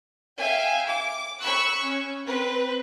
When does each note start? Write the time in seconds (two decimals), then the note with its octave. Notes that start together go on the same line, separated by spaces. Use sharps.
0.37 E5 F5 G5 G#5
0.87 D6
1.40 B5 C#6 E6 F#6
1.82 C#4
2.26 C4 B4